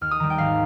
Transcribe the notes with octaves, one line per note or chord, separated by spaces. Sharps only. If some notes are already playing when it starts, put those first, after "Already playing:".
D#2 F6
D#6
D#3 G3 A#5
G5
G#1 F5